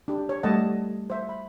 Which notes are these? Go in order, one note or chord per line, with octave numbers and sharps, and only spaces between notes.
D4 G4
C#5
G3 A3 A4 D#5 F#5 A5
C5 E5
B5